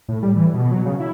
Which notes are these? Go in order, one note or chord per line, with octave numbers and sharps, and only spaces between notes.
A2
G3
E3
B2
F#3
C#3
E4